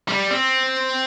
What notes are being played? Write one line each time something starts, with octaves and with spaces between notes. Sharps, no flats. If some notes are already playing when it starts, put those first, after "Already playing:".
G3
C4